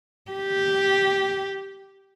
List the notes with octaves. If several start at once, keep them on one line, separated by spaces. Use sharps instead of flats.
G4